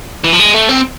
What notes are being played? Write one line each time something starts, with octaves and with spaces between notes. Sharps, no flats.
E3
F3
G#3
A3
C4